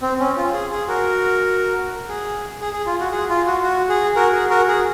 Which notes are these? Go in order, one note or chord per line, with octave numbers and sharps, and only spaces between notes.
C4
C#4
F4
G#4
G#4
F#4 A#4
G#4
G#4
G#4
F4
F#4
G#4
F4
F#4
F#4
G#4
F#4 A#4
G#4
F#4 A#4
G#4